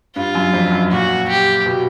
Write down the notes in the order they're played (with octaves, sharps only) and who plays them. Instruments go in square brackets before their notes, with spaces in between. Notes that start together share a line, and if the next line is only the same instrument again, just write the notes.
[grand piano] G2 [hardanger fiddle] F4
[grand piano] F#2
F2
F#2
[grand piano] A#2 [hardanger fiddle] F#4
[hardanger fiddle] G4
[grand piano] B2